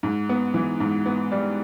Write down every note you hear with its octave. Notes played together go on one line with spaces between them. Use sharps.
G#2
B3
E3
G#2
B3
G3